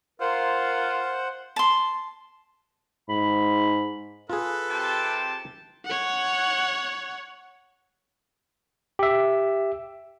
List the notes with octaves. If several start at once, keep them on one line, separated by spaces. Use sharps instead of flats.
F4 A#4 C5 F#5
A5 C6
G#2 B5
F4 G#4 A4 B4
C3 G5 A5
C#5 F#5
G4 E5